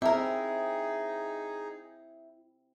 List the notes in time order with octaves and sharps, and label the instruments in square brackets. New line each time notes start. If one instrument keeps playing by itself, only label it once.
[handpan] C4 [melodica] D#4 G#4 [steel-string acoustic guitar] E4 [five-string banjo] A#4 E5